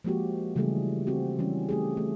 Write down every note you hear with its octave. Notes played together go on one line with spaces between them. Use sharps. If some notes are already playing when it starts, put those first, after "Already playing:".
F3 G#3 A#3 F#4 G4
C#3 E3 G3 A3 F#4 G#4
C4 F#4 G4
E3 G3 C#4
A3 G4 G#4
A3